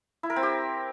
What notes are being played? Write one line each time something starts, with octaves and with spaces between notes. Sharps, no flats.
E4
A#4
C4
G4